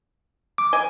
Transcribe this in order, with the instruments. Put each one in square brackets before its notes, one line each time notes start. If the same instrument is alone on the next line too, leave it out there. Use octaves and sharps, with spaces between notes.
[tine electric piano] D6
[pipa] D#5 G#5